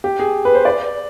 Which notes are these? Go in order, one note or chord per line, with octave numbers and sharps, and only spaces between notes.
G4
G#4
B4
C5
D5